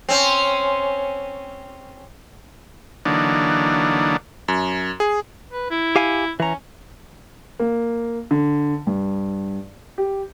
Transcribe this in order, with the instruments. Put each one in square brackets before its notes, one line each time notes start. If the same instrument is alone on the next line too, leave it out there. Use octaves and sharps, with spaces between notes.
[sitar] C4 C#4
[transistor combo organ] D3 E3 F#3 A#3 D4 D#4
[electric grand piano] F#2
G#4
[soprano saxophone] B4
E4
[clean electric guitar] G4 F5 G#5
[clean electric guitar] E3 A#5 [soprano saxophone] C#4
[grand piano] A#3
D3
G2
G4